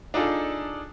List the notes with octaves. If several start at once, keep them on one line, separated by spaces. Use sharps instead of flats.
D4 D#4 F4 G#4 A4